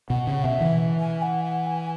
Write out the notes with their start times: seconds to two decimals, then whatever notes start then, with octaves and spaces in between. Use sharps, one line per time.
0.10 B2 F#5
0.27 C#3
0.43 B2 E5
0.60 E3
0.99 G#5
1.22 F#5
1.44 F#5
1.66 G#5